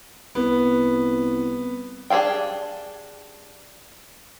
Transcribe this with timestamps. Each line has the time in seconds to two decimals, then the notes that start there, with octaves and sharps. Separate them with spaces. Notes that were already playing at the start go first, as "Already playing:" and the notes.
0.35 C2 B3
2.10 D4 G4 G#4 F5 G5